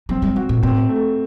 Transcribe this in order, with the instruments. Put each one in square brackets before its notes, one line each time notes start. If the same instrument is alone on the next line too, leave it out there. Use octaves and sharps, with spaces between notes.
[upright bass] F#3 [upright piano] C4
[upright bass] G3
[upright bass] F#3 [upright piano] F#4
[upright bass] A2
[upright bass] A2 [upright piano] C4
[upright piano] A3